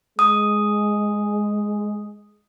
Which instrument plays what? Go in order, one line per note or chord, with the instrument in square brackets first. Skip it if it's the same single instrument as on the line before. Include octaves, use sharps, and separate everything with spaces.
[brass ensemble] G#3 [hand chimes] D#6